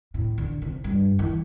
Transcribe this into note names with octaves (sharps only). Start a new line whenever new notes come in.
A2
D3
C3
G2
E3